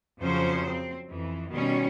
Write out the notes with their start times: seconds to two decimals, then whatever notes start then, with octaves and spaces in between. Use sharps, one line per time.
0.19 F2 C#3 F3 F#3 C#4 C5
0.69 C4
1.09 F2 E3
1.51 B2 D#3 G3 C#4